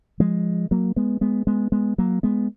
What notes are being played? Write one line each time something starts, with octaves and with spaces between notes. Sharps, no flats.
F3 G#3
F#3 A#3
G#3 B3
G#3 B3
G#3 B3
G#3 B3
F#3 A#3
G#3 B3